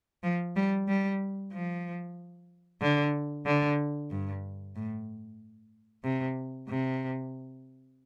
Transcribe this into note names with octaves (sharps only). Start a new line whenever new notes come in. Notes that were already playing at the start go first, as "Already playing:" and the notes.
F3
G3
G3
F3
D3
D3
G2
A2
C3
C3